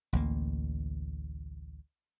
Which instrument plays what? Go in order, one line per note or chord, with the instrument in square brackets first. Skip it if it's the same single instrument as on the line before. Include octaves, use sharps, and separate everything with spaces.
[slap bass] A1 D2 A#3